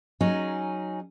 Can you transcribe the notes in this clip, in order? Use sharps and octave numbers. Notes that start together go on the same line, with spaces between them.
F#3 C#4 D#4 G#4